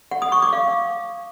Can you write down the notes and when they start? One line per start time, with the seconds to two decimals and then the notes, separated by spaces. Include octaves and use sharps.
0.11 F#5
0.22 D#6
0.32 C#6
0.42 D6
0.53 F5